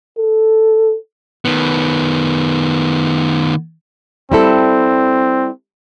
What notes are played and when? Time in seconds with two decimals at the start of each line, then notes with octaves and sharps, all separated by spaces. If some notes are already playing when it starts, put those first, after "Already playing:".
0.17 A4
1.45 D#3 B3
4.32 G3 C4 E4 A4